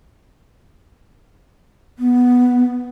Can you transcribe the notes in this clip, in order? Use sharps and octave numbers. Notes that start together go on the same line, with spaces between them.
B3